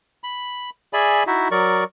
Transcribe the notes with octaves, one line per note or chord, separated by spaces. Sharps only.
B5
G#4 D5 E5 G#5 B5
D#4 E4 F#4 E5
F#3 A#4 D5 C#6